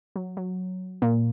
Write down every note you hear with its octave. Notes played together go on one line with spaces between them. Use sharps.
F#3
F#3
A#2 A#3